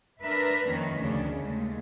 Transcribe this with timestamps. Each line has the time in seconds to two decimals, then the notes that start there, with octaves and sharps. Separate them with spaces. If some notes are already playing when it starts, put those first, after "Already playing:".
0.22 D4 A#4 B4 E5
0.68 F2 D#3 A#3 C#4
0.99 D2 C#3 C#4 D4
1.36 D#2 G#3 A3